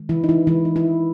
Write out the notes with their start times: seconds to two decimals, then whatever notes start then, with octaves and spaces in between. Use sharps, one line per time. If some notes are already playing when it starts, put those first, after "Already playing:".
Already playing: D#3 G#3
0.09 E3 E4
0.24 D#4
0.29 E3 E4
0.47 D#3 E3 G#3 E4
0.65 D#4
0.76 E3 E4